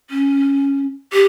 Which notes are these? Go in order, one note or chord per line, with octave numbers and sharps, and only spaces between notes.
C#4
G4